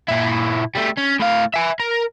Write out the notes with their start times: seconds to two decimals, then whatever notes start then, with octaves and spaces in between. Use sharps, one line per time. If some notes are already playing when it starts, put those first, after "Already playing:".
0.08 A#2 E4
0.75 G3 A3
0.97 C#4
1.20 A2 F5
1.54 E5 G#5
1.80 A#4